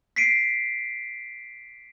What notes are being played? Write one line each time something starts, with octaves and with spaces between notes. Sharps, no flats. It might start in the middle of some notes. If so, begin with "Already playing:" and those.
B6 C7 D7 D#7